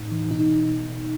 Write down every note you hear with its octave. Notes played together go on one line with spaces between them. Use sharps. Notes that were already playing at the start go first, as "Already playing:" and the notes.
Already playing: A2 D#4
E3
B2 D#4
B2
B2
B2